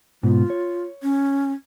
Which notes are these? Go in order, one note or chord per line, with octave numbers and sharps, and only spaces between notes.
G#2 B2 F4
C#5
C#4